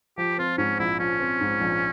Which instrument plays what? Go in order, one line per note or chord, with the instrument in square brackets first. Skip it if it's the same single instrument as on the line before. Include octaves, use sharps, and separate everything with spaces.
[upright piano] F3 [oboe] G4
[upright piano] C4 [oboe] F4
[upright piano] G#2 [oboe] C#4
[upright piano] A#1 [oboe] E4
[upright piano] F3 [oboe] C#4
[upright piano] C4
G#2
A#1